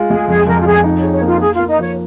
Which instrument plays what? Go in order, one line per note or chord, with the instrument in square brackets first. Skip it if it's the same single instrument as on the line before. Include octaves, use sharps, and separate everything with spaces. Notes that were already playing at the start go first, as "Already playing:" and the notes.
Already playing: [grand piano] G#3 F4
[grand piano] G#3 [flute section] G#4
[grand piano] F2 [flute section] G#4
[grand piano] F2 [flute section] A#4
[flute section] F4
[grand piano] F2 [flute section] G#4
[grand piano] D#4
[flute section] C#5
[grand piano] G#4
[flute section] C#5
[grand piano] A#3 [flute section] F4
[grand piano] A#3 [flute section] G#4
[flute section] F4
[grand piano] A#3
[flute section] D#4
[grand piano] F3 [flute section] C#5